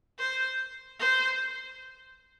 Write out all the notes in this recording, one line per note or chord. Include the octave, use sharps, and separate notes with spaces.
C5
C5